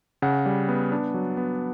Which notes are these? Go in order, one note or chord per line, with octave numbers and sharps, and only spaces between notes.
C#3 F#5
G3
B3
D4
F#3
B3